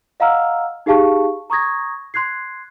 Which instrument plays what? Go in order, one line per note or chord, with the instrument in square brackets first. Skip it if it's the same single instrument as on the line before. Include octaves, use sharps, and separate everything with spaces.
[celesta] D#5 F5 F#5 A#5 E6 F6
D#4 G4 G#4 F5 A5 C#6
A#5 C#6 D#6 G#6 A#6
C6 F#6 G#6 C7